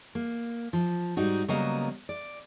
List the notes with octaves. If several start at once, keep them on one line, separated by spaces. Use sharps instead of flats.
A#3
F3
G#2 G3 D#4 F#4
C#3 F#3 G3 A#3 B3 D#5
D5